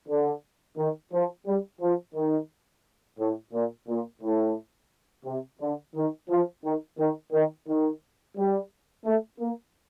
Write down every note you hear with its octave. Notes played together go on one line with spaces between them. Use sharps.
D3
D#3
F3
G3
F3
D#3
A2
A#2
A#2
A2
C3
D3
D#3
F3
D#3
D#3
D#3
D#3
G3
A3
A#3